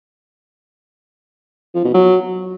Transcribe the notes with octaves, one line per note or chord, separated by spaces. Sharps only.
F3
B2
F#3